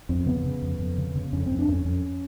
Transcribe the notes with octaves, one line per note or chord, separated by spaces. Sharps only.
F2 C4
C#3 B3
C#3
F2
F2
C#3
C#3
F2 C#4
F2 C4
D4
F2 C#4
F2